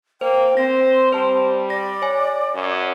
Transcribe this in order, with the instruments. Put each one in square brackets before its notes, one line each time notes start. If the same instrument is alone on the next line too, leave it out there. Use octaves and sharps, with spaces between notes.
[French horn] A#3 [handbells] C5 [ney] G5
[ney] C4 [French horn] C5 [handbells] A#6
[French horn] G3 [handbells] C5 A5
[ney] D5 [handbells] A#6
[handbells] C#5 G#5
[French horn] F#2